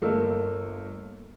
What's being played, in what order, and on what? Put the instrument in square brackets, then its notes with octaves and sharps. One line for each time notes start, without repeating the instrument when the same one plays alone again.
[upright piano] G1 A3 A#3 A#4 D#5 E6